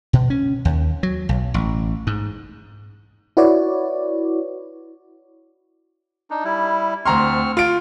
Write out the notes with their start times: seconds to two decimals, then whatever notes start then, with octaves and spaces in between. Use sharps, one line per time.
0.13 B2
0.30 C#4
0.65 D#2
1.03 F#3
1.29 B1
1.54 A1
2.07 G#2
3.37 E4 F#4 B4 C#5 D5
6.31 D4 D#4
6.44 G3 E4
7.06 D2 C4 A#5 C6 C#6 F6
7.57 F4 D7